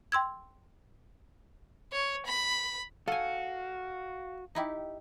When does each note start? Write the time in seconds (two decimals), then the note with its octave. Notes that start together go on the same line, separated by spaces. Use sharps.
0.12 G5 C6 E6 G#6
1.92 C#5
2.26 B5
3.08 F#4 A4 F5 G#5
4.55 D#4 E4 G4